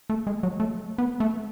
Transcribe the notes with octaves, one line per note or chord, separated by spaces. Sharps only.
A3
G#3
F#3
A3
B3
A3